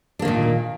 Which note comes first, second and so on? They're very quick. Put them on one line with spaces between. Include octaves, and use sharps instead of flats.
D4 A#3 D#3 A#2